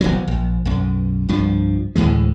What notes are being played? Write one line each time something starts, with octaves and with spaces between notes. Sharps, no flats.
D#1 B1 E2 F#3
A#1
B1 F#2
C2 G2 F3
D2 A2 E3 G#3